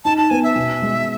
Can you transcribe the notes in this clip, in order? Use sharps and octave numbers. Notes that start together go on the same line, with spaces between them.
D#4 A5
A5
B3 G#5
E5
B2
G#3